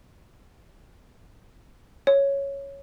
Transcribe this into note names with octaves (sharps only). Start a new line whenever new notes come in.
C#5